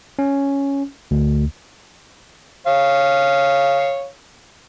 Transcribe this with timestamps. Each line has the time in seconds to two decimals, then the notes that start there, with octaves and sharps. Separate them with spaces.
0.19 C#4
1.11 D2
2.67 C#5 F5